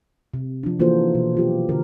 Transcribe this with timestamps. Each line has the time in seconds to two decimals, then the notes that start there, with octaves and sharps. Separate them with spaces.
0.34 C3
0.63 F3 D4
0.80 E3 A#3 F4 F#4 A4 C5
1.15 B2
1.35 F#3 F4 G4
1.69 D3 A#4